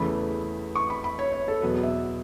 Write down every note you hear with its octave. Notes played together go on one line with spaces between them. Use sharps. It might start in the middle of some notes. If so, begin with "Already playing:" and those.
Already playing: E2 C#3 E3 A3 B5
C#6
B5
B5
C#5
C#5
A4
E2 B2 F#3 B3 B4
E5